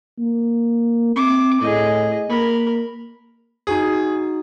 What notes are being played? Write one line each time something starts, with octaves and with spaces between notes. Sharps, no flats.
A#3
C4 D6
A2 G#4 D#5
A#3 A#4 B5
D#4 F#4 G#4 D#6